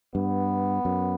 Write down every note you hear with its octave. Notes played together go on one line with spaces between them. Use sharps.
G2 B3
F#2